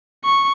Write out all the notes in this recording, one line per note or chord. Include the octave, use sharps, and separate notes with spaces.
C#6